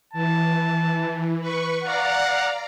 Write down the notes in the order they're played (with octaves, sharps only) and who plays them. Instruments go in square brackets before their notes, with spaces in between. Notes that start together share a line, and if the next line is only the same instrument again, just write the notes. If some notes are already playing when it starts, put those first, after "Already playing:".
[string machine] E3 [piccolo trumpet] A5
[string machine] B4 C#6
[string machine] D5 F5 A#5 [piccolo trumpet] F#5